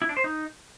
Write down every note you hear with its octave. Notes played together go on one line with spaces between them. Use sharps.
E4
D4
C5
D#4